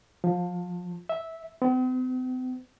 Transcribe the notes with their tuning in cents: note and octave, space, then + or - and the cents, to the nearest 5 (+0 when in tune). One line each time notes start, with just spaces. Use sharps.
F3 +25
E5 -10
C4 -45